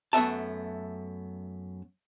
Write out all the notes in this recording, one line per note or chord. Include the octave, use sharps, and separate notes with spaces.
F#2 A3 B3 E5 A5